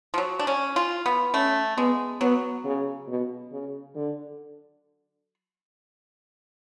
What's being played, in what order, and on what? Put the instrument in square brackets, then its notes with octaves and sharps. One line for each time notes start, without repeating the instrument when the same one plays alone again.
[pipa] F3
F#3
D4
C#4
F4
B3
[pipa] A3 [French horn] C#4
[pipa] G#3 [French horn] B3
[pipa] F#3 [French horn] B3
[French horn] C#3
B2
C#3
D3